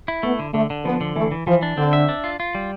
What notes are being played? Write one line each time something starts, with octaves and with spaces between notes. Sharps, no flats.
E4
A3 B3
D3
D3 A3
D3
F3 B3
D3
E3 A3
E3
E3 F3
D4
D3 C4
E5
D4
F4
F4
G3